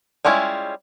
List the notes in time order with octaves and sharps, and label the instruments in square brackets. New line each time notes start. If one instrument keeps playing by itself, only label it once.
[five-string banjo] G3 G#3 C#4 E4 F4